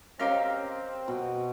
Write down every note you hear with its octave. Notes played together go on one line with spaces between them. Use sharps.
C4 C#4 G4 A#4 C#5 D#5 F5
B2